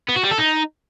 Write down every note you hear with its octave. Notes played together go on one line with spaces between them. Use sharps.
B3
F#4
G3
A4
D#4